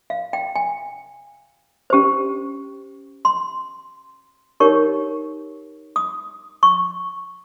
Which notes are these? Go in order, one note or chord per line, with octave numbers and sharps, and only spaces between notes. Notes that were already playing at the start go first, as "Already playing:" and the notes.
F5
G5
G#5
C#4 G4 C5
C6
D#4 G4 A#4 C#5 C#6
D#6
C#6